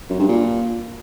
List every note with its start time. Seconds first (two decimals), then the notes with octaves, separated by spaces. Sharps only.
0.10 F#2
0.19 G2
0.29 A#2